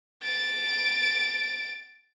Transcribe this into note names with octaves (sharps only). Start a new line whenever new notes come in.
A6 D7